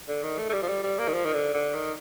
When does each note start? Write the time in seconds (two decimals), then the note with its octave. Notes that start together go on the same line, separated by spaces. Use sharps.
0.08 D3
0.23 D#3
0.38 A3
0.49 A3
0.53 G3
0.62 F3
0.69 G3
0.83 G3
0.99 A#3
1.08 D#3
1.13 F3
1.25 D#3
1.33 D3
1.54 D3
1.74 D#3